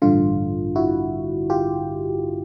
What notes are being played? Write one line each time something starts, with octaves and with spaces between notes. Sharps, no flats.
A1 G2 D3 F4
E4 F#4
F4 G4